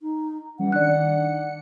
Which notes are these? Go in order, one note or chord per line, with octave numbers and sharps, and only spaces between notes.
D#4
E3 G3 C#4 F#5
D#3 D4 D5 F#6 C#7